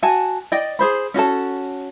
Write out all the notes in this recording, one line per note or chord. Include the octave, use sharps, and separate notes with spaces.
F#4 F#5 G#5 A5
D5 D#5 G5
G#4 C5 B5
C#4 F#4 A4 A5